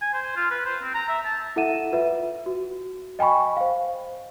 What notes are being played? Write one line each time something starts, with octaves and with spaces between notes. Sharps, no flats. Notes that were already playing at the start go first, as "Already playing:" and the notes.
G#5
C5
F4
B4
C5
C4
A#5
E5
A5
E4 A4 E5 F#5 D#7 E7
F4 B4 E5
F#4
D#5 G5 G#5 B5 C#6
C5 F5